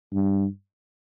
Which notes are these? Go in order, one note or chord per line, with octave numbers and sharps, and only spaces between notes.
G2